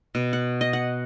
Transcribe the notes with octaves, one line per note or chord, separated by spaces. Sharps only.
B2
F#5
D#5
F#5